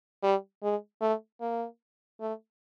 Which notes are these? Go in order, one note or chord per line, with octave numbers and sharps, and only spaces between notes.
G3
G#3
A3
A#3
A3